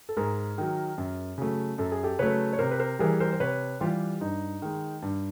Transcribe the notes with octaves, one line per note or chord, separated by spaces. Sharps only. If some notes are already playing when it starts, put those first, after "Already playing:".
A4
G#2 G#4 A#4
D#3 F#3
F#2
C#3 F#3 A3
F#2 A4
G#4
G4 A4
C#3 F#3 A3 B4 C#5
C#5
C3 A#4 C5
B4
A#4 C5
E3 G3 G#4 A#4
A#4 C5
C5
C3 B4 C#5
E3 G3 F4 G4
G2 D#4
D#3 G#3
G2